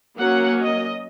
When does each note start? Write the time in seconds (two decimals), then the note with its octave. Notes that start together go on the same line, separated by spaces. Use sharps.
0.16 F#3 A#3 C#4 F#5
0.60 D#5